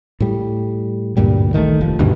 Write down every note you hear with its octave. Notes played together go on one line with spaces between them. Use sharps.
A2 G3
D2 G2 A#2 G3
A1 D#3 F#3 A3
F1 F3
D2 G2 B2 D#3